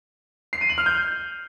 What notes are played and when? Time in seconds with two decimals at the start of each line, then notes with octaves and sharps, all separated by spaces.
0.53 C7
0.61 D#7
0.69 F#7
0.78 F6
0.86 G6